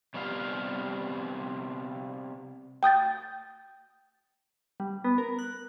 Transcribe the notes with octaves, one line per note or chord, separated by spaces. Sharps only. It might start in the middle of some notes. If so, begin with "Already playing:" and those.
C3 G3 B3 F4 A#4 F5
G5 D#6 G6 A6
G3
B3
A#4
F#6